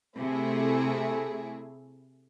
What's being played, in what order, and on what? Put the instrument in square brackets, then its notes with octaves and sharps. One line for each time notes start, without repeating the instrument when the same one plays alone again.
[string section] C3 A3 E4 G#4